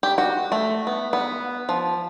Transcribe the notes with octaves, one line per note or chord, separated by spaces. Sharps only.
G4
F#4
A3
B3
B3
F3